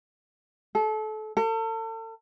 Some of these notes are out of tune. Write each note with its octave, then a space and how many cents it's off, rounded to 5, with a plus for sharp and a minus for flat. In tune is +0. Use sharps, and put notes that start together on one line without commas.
A4 -30
A4 +40